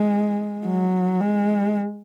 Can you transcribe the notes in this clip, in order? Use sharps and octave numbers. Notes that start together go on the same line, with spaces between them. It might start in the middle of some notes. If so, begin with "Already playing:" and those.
Already playing: G#3
F#3
G#3